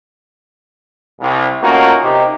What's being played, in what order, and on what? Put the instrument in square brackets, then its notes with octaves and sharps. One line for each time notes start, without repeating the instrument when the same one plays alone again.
[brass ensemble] C2
A3 A#3 C#4 D#4 F4 F#4
C3 D#4 G4